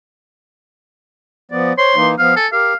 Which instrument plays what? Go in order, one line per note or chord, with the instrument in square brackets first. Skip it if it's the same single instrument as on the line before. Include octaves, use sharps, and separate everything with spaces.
[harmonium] F3 B3 D5
[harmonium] C5 C#5 [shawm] C6
[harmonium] E3 A#3 D#4
[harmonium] F3 B3 [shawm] F5
[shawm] A4 [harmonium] G#5
[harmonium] G4 A#4 [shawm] F5